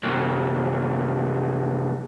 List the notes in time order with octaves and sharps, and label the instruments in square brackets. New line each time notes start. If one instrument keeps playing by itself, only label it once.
[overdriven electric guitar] C2 F#2